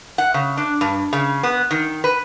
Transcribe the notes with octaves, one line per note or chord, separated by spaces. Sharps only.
F#5
C#3
D4
G2
C#3
B3
D#3
B4